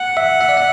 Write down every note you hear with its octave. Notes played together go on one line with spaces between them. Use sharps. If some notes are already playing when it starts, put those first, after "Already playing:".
Already playing: F#5
E5
E5
D5
E5